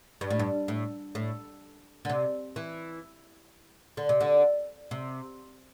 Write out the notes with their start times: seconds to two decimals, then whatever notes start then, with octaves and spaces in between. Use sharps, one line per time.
0.21 G2
0.30 A2
0.39 G2
0.68 A2
1.15 A2
2.05 D3
2.09 C3
2.56 E3
3.97 D3
4.09 C3
4.21 D3
4.91 C3